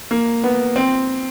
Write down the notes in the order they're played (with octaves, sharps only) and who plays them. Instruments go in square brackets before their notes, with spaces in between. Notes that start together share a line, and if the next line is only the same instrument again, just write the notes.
[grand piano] A#3
B3
C4